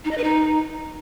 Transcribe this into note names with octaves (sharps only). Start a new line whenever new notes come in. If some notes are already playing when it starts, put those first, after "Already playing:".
D#4
D#5
B4
D#4